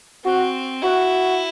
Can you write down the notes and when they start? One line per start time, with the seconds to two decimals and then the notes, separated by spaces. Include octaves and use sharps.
0.25 C4 F#4
0.82 E4 F#4